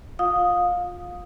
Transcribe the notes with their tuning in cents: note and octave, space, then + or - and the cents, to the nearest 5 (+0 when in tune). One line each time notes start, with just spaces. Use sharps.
F4 +25 F5 +25 D#6 +0